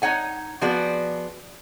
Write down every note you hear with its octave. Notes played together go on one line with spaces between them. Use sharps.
D#4 C#5 F#5 G#5
F3 B3 F#4 G#4 D5